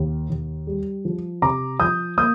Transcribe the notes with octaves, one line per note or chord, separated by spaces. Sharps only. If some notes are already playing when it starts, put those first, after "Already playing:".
Already playing: D#2
D#2
G3
F3
C3 A#5 D6
F3 D#6 G6
A#3 D#6 G6